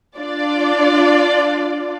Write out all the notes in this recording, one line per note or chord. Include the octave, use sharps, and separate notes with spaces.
D4 F4 D5